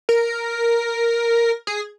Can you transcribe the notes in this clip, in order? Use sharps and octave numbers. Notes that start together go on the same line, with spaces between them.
A#4
G#4